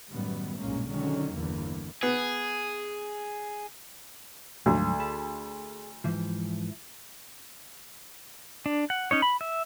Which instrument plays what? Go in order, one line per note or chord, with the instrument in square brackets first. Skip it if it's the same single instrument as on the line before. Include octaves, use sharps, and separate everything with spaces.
[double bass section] F#2 A2 D#3 G3 B3
B1 G2 A#2 G#3 A#3 C#4
D3 D#3 F#3 G#3 C#4
G1 E2 D3 E3 G3 A#3
[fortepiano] B3 [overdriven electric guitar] G#4
[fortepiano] D2 [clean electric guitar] G#2 F3 F#3
[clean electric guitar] G#4 A5 B5
G#2 E3 F3
[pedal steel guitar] D4
F#5
C#4 D#4 C#5
B5
E5